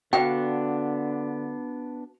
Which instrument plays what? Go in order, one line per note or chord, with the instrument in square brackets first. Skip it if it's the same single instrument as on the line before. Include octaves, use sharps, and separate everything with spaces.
[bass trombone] D3 [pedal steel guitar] B3 D4 [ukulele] F#4 F5 [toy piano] G5